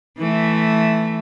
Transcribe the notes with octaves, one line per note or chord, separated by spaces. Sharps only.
E3 A3